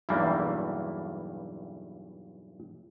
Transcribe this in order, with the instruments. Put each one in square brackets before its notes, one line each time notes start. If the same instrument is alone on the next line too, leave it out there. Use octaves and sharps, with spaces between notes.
[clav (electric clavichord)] B1 E2 G2 E3 G3 A#3